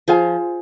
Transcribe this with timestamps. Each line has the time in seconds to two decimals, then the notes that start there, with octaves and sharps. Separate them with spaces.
0.08 F3 G#4 C5 F5 G#5